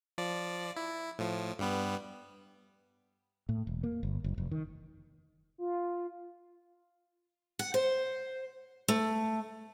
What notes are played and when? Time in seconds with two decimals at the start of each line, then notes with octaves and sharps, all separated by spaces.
0.18 F3 D5
0.77 E4
1.19 A2 F3
1.59 G2 G3 B3
3.49 A2
3.67 E1
3.83 A#3
4.03 G1
4.24 F#1
4.38 F1
4.51 D#3
5.58 F4
7.59 F#5
7.74 C5
8.88 A3